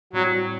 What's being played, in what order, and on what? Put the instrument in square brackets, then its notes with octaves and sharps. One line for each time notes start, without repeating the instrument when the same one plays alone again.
[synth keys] A2 G3 C4 F#4 [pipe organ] F#3